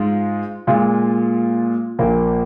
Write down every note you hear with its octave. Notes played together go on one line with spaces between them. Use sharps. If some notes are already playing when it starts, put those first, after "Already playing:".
Already playing: G#2 G#3 F4
A#2 G#3 F4
A#1 A#2 A#3